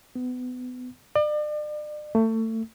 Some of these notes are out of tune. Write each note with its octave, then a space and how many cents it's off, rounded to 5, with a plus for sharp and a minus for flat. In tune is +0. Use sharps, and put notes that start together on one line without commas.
B3 +25
D5 +40
A3 +25